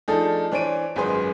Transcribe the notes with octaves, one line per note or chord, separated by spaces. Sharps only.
F3 A3 D4 D#4 G#4 A4
E3 D4 C5 C#5 D7 D#7
G#1 C#2 F#2 G#4 B4 C6